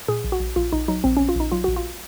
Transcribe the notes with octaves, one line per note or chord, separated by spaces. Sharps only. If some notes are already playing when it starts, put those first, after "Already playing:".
A#2 G#4
A#1
F#4
A#1
A#1 F4
A#1 D#4
F#3 D#4
A#1 C4
A#1 C#4
F4
A#1 D#4
F#3 F4
A#1 F#4
F4